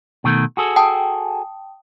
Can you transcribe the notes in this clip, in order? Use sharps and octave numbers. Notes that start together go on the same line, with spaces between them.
B2 D#3 A3
F#4 G#4 A4
G5 A5 D#6